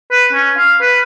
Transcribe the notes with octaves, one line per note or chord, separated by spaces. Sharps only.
B4
C#4
F5
B4